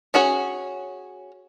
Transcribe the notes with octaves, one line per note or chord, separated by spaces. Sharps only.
C#4 F#4 G#4 C#5